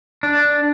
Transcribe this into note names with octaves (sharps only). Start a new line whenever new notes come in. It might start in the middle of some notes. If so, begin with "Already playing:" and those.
D4